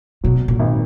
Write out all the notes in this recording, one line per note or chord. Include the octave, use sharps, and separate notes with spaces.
B2 F#3
A#2
G#1